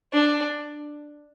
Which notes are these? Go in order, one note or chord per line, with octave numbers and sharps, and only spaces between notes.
D4